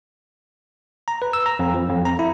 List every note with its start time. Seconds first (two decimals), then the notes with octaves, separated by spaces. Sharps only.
1.08 A#5
1.22 B4
1.33 E6
1.46 A#5
1.59 F2
1.74 F3
1.89 F2
2.05 A#5
2.19 E4